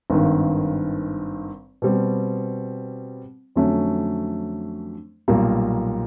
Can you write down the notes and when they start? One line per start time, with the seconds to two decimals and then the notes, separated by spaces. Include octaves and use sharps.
0.10 G#1 G2 D#3
1.82 B2 G3 C4
3.56 F2 D3 F#3 A3 C#4
5.28 B1 A#2 G3 A#3